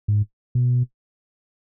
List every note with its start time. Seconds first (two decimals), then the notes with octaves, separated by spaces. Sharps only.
0.08 G#2
0.55 B2